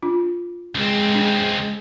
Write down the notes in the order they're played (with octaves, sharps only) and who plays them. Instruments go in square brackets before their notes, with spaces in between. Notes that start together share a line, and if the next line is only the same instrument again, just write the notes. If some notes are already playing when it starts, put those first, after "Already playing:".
[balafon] D4 F4
[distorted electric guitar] C#2 C4 [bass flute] G#3
[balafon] D4